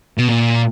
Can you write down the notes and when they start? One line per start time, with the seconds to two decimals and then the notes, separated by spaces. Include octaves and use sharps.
0.18 B2
0.28 A#2